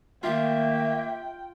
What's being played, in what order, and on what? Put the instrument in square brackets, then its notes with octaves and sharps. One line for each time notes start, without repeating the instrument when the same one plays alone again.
[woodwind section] D#3 A3 A#3 [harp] F4 [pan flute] E5 [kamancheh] G5